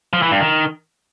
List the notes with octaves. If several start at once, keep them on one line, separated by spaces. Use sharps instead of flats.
F3
E3
G2
D#3